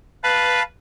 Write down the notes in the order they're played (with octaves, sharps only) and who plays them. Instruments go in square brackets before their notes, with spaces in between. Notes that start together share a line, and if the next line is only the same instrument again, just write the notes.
[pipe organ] B4 [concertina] F5 A5 B5